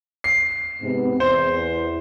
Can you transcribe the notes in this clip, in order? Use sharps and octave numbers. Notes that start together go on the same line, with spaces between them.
C7
G#2 C3 B3
E2 C5